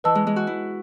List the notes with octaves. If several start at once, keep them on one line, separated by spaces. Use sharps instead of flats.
E3 B4 D#5 A5 E6
G#3
G#3
F#4
E4